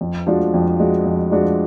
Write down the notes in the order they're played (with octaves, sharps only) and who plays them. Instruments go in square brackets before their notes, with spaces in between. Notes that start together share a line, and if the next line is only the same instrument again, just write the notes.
[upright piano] F2
F3 G#3 D4 F#4
F2
F3 G#3 D4 F#4
F2
F3 G#3 D4 F#4